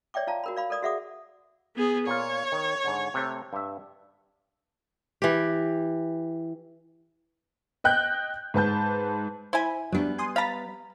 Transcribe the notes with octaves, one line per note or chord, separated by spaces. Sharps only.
C#5 D5 E5 G5 D6
F4 F5 A5 A#5
F#4 A#4 B5
D5 F5 B5
A4 A#4 D5 D#6
F#4 G#4 E5 F#5 D6 D#6
B3 G#4
A#2 F4 C#5
D#3
G#2 D3
C3 A3
G2 E5
E3 G4
D#5 G5 F#6 G6
G#2 B4 A5 G6
E4 C5 G#5 B5
F#3 G3 B3 D4
G#5 C6 D#6
F5 A#5 B5 A6 B6